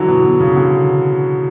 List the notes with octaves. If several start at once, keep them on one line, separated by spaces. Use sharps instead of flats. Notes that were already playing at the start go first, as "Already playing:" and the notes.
Already playing: D3 E3 F#3
B2
B2
C#3
D3